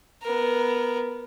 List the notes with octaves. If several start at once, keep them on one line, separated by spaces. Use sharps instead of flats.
B3 A#4